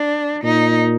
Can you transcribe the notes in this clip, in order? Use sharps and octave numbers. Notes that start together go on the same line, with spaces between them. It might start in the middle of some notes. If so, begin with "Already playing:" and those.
Already playing: D4
A#2 D#4